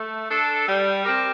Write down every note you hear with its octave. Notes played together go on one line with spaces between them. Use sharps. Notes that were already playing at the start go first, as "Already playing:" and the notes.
Already playing: A3
D4 A4
G3
C4 G4 A#4